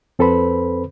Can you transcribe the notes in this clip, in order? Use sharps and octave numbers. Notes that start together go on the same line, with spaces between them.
F2 C4 A4 B4 C5 B5